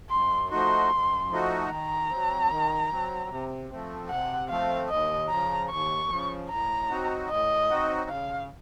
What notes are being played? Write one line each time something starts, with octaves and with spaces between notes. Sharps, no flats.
F#2 C6
F3 A3 D#4 F#4 C6
F#2
F3 A3 D#4 F#4
D#3 A#5
F#3 C4
D#3
F#3 C4
C3
F3 A3 C4
C3 F#5
F3 A3 C4 F5
D#2 D#5
C#3 F3 A#5
D#2 C#6
C#3 F3
A2 A#5
F#3 C4 D#4 F#4
A2 D#5
F#3 C4 D#4 F#4
C#3 F5